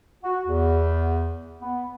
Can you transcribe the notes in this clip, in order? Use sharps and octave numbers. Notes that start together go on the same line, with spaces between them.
F#4
E2
B3